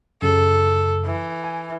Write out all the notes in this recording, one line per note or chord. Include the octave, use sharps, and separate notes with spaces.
F#2 C#3 A4
E3
G#5